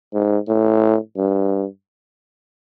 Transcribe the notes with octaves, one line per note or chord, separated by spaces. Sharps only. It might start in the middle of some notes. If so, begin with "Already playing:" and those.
G#2
A2
G2